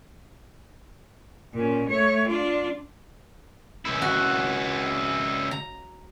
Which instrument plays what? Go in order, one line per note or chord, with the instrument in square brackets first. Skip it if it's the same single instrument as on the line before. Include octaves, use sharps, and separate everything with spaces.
[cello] A#2 C#4
A3 C#5
D4 F4
[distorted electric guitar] C#2 E4
[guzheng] F#4
A#5